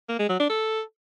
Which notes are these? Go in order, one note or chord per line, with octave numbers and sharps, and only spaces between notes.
A#3
G#3
F#3
D4
A4